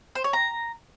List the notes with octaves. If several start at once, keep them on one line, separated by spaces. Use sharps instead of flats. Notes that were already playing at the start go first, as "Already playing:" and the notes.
C5
C#5
A#5